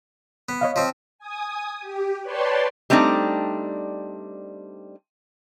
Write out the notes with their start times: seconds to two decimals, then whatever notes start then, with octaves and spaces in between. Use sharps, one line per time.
0.49 B3
0.61 C#5 D#5 F5
0.76 F3 C4
1.19 G#5 D#6
1.81 G4
2.22 B4 C#5 D5 G5 A5 C6
2.90 G3 A3 C4 D4 D#4